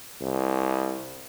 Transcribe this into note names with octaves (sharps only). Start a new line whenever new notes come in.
C2